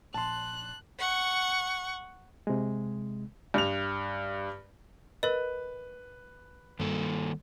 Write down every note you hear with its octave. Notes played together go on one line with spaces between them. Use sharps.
A#1 A5 C6 F#6
F#5 C#6
C3 G#3
G2 F7
A#4 B4 D#5
G2 D#3 A#3 A4